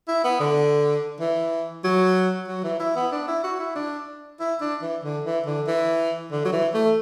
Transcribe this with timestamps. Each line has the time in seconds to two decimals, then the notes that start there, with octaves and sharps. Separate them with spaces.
0.08 E4
0.24 B3
0.40 D3
1.20 E3
1.84 F#3
2.48 F#3
2.64 E3
2.80 E4
2.96 B3
3.12 D4
3.28 E4
3.44 F#4
3.60 E4
3.76 D4
4.40 E4
4.61 D4
4.82 E3
5.04 D3
5.25 E3
5.46 D3
5.67 E3
6.32 D3
6.45 F#3
6.53 E3
6.74 A3